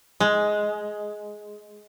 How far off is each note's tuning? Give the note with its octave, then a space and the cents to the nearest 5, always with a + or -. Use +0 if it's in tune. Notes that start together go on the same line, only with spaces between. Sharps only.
G#3 +10